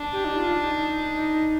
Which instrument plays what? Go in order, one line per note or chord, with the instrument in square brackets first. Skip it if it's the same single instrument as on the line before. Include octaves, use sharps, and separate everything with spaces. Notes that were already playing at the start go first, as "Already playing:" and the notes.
Already playing: [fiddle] D4
[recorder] G4
D#4
F4
D#4